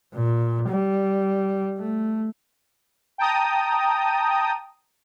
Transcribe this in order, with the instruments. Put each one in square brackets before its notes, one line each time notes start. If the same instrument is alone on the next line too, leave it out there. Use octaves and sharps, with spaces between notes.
[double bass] A#2
G3
A3
[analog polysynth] G5 A5 A#5 D#6